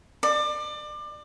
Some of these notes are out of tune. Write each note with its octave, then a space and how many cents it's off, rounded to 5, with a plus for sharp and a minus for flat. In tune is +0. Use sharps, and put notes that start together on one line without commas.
D5 +30